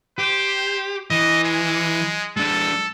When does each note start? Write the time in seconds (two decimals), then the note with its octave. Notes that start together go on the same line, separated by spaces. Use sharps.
0.18 G4 C5
1.11 E3 D#5
1.44 G#3
2.37 G#3 D4 A4